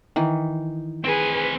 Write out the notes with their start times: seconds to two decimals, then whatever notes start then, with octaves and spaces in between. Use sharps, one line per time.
0.16 D#3 E3
1.04 C4 G#4 B4 G#5